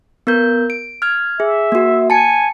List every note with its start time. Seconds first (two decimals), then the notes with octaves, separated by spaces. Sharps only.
0.27 B3 A#4 G6
0.70 D7
1.02 F6 G#6
1.40 G#4 E5
1.72 A#3 F#4
2.10 G#5 A5 C#7